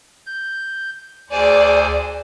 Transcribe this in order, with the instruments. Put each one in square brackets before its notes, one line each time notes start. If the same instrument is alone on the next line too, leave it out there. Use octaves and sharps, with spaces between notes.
[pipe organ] G6
[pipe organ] D2 C5 G#5 [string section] G#4 D5